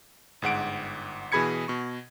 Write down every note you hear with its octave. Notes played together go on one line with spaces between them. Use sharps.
G1 G#2 F#5 D7
B2 E3 G#4 B5 G#6 C#7
B2 C#6